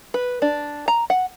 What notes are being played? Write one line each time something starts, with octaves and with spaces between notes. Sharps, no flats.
B4
D4
A#5
F#5